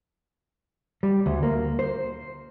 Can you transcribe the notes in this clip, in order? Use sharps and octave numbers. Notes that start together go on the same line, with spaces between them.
G3
D2
A#3
C5